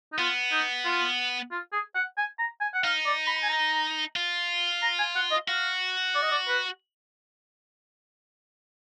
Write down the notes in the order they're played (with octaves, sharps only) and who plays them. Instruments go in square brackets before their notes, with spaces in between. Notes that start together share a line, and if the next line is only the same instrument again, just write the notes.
[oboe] D#4
[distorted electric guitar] B3 [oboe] F4
[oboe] D#4
F4
F4
G#4
F#5
G#5
A#5
G#5
F#5
[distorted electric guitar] D#4 [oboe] F5
[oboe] D5
B5
G#5
A#5
[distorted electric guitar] F4
[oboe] A#5
G#5
F#5
D#5
[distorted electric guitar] F#4 [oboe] F5
[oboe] D5
D#5
D5
B4